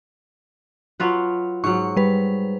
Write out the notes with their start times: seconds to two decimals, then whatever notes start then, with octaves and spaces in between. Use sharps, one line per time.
1.00 F#3 F4 B4
1.64 G#2 F#3 C#6
1.97 G3 B4